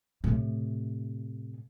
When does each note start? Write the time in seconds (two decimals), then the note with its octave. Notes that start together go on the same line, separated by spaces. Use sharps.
0.24 A2 C3